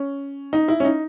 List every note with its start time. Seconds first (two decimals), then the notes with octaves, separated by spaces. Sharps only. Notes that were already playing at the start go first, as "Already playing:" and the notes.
Already playing: C#4
0.53 D#4
0.68 E4
0.80 C#4
0.84 D#4